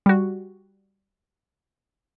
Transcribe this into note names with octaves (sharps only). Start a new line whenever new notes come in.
G3 F#4